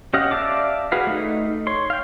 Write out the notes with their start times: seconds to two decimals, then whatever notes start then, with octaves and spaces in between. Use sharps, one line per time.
0.14 C#4 G4 D#5 F5 F#5
0.31 D5 E5 F5 A5 D6
0.92 F#4 G#4 B4 F5
1.07 A3 D#4
1.67 C#5 C6
1.90 F5 G5